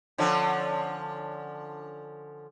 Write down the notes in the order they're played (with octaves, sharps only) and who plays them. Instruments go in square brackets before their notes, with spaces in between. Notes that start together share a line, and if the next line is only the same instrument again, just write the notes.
[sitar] D3 F3 C#4